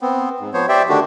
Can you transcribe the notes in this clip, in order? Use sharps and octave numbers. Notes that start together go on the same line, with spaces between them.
B3 C4
G#2
F3 B3 C5 C#5
G4 C5 D5 E5 G5
D3 D#3 A3 D4 F#4 G4